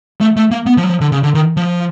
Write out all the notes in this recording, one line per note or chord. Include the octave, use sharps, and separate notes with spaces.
A3
A3
A#3
B3
F3
F#3
F3
D3
C#3
D3
D#3
F3